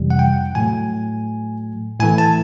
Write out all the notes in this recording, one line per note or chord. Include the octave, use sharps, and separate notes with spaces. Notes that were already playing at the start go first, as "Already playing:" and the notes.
Already playing: F2 C3 E3 G3
F#5
G5
A2 F#3 A3 G#5
A2 E3 A3 G#5
A5